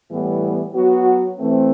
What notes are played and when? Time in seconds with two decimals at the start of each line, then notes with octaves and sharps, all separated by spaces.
0.11 A2 E3 G3 B3
0.75 F#3 B3 F#4
1.39 E3 A3 C4